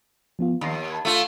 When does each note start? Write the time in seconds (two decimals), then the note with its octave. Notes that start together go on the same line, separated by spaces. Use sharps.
0.39 F3 B3 F4
0.61 D#2 B5 A#6 C7
0.90 A5 B5 G#6
1.05 A3 F4